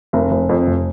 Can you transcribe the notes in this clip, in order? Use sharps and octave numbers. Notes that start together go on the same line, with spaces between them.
F1 A#4
F1
F2
F1